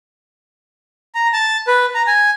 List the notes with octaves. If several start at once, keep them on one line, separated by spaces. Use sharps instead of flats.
A#5
A5
B4
A#5
G#5